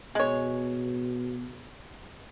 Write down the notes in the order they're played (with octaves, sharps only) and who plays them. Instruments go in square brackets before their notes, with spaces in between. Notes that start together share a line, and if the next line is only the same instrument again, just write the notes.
[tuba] B2 [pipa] G#3 C#5